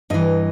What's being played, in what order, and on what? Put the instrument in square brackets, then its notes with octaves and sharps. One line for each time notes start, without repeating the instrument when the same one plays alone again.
[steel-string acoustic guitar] G2 E3 D#5